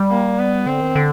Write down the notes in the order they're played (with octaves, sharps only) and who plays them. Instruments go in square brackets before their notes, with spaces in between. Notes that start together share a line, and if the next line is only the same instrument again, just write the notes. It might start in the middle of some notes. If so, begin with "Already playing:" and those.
Already playing: [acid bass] G3
[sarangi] A#3
B3
[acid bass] D3 [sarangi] C4
[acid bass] D#3
D3